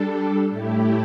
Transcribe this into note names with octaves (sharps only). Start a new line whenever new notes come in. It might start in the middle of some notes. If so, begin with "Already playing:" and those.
Already playing: G3 D4 A4
A2 A3 E4 G4